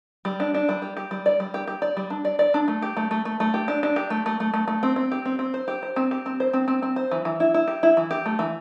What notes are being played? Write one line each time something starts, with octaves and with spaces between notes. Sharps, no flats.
G3
D4
D4
G3
G4
G4
G3
D5
G3
G4
G4
D5
G3
D4
D5
D5
D4
A3
G4
A3
A3
A3
A3
G4
D4
D4
G4
A3
A3
A3
A3
A3
C4
C4
G4
C4
C4
C5
G4
C5
C4
G4
C4
C5
C4
C4
C4
C5
E3
E3
E4
E4
G4
E4
E3
G4
A3
E3